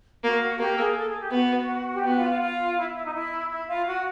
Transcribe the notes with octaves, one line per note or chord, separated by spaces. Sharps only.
A#3 F#4
A#3 G4
A4
G#4
A4
G#4
G4
B3 F#4
G4
B3 F#4
F4
F4
F4
E4
E4
D#4
E4
E4
F4
F#4